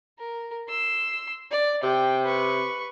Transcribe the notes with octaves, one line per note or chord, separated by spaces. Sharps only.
A#4
C6 E6
D5
C3 G5
B4 C#6